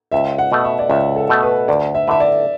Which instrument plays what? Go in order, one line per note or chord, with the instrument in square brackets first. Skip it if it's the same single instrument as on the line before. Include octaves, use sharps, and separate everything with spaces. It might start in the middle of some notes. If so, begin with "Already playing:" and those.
[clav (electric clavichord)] C#2 [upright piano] E5
[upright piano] F#5
[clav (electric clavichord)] B2 A3
[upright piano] E5
D5
[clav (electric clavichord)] C#2 [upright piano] E5
[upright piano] A4
[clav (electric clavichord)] B2 A3
[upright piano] B4
[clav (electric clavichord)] D2 [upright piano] D5
[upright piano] E5
[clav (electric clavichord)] D3 A3 E4 B4 [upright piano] E5
[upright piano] D5